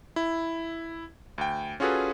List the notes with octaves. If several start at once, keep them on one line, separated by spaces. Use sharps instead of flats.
E4
D2 G5
C#4 F4 F#4 G#4 A4 B4